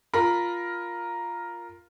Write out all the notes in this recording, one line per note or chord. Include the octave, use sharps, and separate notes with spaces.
F4 A#4 B5